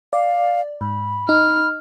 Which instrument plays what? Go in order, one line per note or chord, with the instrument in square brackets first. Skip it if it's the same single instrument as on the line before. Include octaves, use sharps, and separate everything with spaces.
[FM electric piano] D5 [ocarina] F5
[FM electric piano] G#2 [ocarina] B5
[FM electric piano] D#4 [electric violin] F6